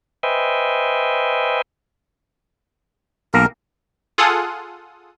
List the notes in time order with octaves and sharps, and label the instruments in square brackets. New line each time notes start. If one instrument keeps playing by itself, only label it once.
[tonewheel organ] B4 C5 D#5 E5 G5 G#5
[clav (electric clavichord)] B1 A#3 A#5 [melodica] A#4
[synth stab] F4 G#4 A4 F#5 D#6